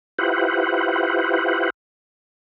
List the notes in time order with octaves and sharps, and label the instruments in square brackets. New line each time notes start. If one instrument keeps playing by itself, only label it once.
[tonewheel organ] E4 F4 G4 B4 C5 F#5